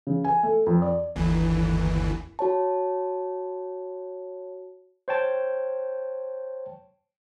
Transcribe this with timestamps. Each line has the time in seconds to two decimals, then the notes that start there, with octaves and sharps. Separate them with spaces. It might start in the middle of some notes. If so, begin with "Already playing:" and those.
0.07 C#3
0.24 G#5
0.43 A3
0.66 F2
0.82 D5
1.16 G1 D#2 E3
2.39 F#4 C#5 A5
5.08 C5 C#5 G5 A5